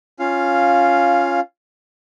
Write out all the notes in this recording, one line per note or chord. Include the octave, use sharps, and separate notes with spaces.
C#4 F4 F5